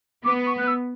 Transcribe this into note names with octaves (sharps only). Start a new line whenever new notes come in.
B3 D6
C#6
F#6
E6